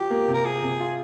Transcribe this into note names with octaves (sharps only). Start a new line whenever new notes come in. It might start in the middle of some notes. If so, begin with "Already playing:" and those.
Already playing: F3 G4
A#3
C3
A#4
F3 G#4
C3
F4